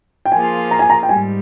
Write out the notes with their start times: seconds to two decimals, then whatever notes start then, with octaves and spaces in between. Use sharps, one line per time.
0.25 G5
0.32 F3 A#3 F4 G#4 G#5
0.71 A#5
0.79 G#5
0.90 A#5
1.03 G5
1.09 G#2 G3 G#5